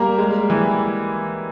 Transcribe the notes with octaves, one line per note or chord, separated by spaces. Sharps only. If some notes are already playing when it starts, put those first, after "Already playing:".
Already playing: G3 A#3 A#4
G#3
E3